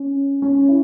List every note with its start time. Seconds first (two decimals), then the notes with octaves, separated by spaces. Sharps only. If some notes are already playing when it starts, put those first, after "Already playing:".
Already playing: C#4
0.42 C#4
0.68 E4